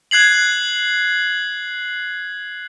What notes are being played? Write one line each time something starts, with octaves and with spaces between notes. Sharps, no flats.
F#6 G#6 C7 F#7